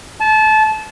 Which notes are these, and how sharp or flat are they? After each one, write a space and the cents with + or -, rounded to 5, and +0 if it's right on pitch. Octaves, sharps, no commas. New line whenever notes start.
A5 -25